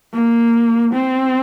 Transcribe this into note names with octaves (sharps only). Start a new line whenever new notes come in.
A#3
C4